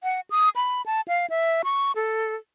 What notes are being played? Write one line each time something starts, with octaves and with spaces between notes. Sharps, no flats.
F#5
D#6
B5
A5
F5
E5
C#6
A4